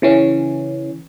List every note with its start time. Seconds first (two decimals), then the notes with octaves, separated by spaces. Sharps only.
0.02 C#3 E3 C#4